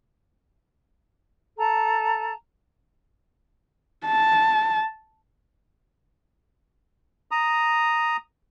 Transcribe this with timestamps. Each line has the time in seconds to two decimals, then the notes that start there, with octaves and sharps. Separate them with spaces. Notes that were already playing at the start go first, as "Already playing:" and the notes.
1.57 A4 A5 A#5
4.06 A5
7.31 A#5 D#6